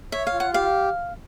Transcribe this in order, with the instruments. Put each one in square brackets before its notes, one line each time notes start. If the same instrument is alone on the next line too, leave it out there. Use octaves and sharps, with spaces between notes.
[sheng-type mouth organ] C#5 [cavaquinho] E5
[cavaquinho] F5
[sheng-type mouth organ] F4
[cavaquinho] F#5
[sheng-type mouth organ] G4 [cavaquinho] F5